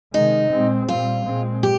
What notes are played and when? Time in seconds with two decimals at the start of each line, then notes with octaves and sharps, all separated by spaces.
0.14 C3 D#3 G#3 D#4
0.52 A#2 G#3 C4
0.88 A#2 G3 C4 F4
1.26 A#2 G#3 C4
1.63 G4